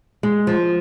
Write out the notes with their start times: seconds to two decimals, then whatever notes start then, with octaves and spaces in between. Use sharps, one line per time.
0.23 G#3
0.47 F3